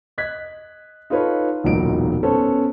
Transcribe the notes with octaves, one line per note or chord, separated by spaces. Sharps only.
D#5 F#6 G#6 B6
D#4 F4 A4 B4 C#5
E1 C#2 A#2 F#3 D#4 D7
B3 C#4 A4 C5 C#5